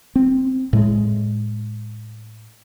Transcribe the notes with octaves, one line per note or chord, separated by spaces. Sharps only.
C4
A2 G#3